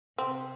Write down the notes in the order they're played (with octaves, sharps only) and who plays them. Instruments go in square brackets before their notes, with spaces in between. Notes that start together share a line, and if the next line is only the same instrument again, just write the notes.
[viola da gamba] C3 [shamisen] C4